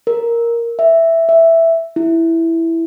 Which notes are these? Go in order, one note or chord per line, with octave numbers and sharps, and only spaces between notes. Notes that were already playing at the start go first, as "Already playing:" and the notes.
A#4
E5
E5
E4